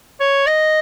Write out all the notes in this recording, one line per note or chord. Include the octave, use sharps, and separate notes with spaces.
C#5
D#5